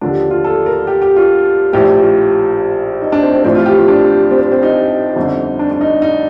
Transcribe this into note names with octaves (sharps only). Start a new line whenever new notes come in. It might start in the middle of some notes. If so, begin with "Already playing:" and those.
D#2 D3 F3 D4
F4
A4
A#4
G4
G4
F4
A#1 A2 F3 G4
G4
F4
D#4
D4
C4
C4
A1 A2 F3 C4
F4
G4
F4
D4
C4
C4
C4
D#4
G1 F2 D3
D4
D4
D#4
D#4